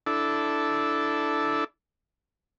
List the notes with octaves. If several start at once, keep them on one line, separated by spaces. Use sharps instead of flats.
D4 E4 A4